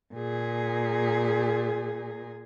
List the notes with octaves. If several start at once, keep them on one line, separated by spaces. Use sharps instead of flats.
A#2 G#4